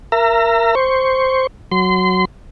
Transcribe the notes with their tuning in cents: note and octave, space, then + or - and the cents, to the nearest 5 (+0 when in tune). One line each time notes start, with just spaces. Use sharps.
A#4 +0 E5 +35 A#5 -30
C5 +0 C#6 +0
F#3 +0 C6 -30